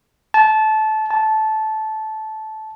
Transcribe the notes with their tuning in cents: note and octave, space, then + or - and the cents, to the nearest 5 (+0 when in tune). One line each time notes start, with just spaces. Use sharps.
A5 -20
A5 -15